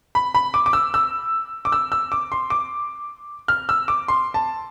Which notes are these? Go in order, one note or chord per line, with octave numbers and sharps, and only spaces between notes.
B5
B5
D6
D6
E6
E6
D6
E6
E6
D6
C6
D6
F6
E6
D6
C6
A5